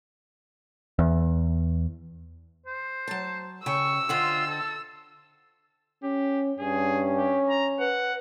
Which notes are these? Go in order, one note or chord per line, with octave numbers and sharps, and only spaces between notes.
E2
C5
F#3 A5
C#3 G5 C#6 E6
D3 C4 F4 D#5
A4
C#4 G4
G2 C#4 G#4
G4
A#5
B4 F#5